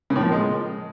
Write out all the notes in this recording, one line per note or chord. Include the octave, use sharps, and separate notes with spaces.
C#3
A2
F3
A#3
G#3